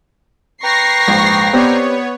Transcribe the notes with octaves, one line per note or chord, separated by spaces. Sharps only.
B4 G5 A#5 C#6 A#6 C7
A#1 G#2
B3 C4 G4 C#5 D5